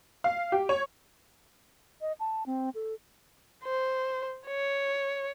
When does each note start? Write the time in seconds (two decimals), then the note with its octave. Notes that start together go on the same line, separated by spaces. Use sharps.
0.24 F5
0.52 G4
0.69 C#5
2.01 D#5
2.20 A5
2.46 C4
2.75 A4
3.64 C5
4.47 C#5